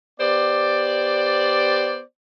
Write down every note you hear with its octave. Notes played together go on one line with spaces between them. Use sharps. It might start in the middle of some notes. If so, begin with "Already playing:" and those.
B3 G4 C5 D5